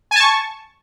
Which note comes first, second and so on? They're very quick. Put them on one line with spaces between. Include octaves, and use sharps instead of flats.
G#5 A5 C#6